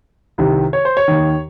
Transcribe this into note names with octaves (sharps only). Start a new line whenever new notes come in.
C2 C3 D#3
C#5
C5
C#5
D#2 D#3